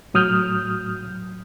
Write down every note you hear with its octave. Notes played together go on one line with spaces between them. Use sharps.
A2 F#3 D#6 F6 G6